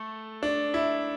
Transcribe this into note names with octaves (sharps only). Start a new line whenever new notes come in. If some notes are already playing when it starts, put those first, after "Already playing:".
Already playing: A3 A4
D4
E4